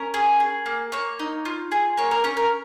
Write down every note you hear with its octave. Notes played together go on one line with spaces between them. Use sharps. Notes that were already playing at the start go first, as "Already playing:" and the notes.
Already playing: C#4 A#4
G#4
G#4
A#3
A#3 C#5
D#4
F4
G#4
A#3 C#5
A#4
C#4 C#5
A#4